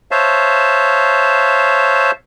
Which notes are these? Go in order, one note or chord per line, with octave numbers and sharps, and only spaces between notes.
C5 C#5 E5 F5 A5